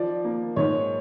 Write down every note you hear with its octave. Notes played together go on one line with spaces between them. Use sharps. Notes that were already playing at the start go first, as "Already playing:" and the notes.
Already playing: F3 D5
A#3
G#2 C#5